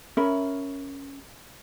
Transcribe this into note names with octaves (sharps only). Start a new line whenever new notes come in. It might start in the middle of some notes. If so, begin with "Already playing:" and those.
C#4 A#4 E5 B5